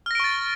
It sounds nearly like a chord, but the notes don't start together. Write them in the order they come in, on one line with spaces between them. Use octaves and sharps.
F6 A#6 D7 C#6 A6